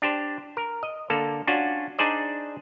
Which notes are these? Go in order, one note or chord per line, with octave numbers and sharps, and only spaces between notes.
D4 G4 C5
A#4
D#5
D3 A#3 A4
C#4 D4 F4 F#4
D4 D#4 G#4 C5 D5